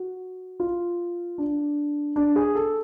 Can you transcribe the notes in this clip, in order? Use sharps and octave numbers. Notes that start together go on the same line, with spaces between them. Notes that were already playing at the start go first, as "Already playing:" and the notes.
Already playing: F#4
F4
D4
D4
G#4
A4